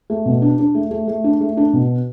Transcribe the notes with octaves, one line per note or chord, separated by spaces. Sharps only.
A3
B2
D4
D4
A3
A3
A3
D4
A3
D4
B2